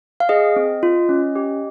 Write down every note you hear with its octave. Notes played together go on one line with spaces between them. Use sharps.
F5
G#4 D#5
C4
F4
C#4
G4